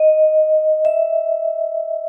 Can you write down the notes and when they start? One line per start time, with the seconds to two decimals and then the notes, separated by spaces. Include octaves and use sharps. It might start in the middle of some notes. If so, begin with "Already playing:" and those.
Already playing: D#5
0.85 E5